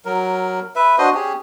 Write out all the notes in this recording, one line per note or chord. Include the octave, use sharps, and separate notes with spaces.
F#3 A#4
B4 E5
D4 F#4 C5 D#5
C#4 G4 G#4